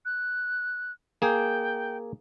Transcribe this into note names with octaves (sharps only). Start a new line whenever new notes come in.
F#6
A#3 G#4 G5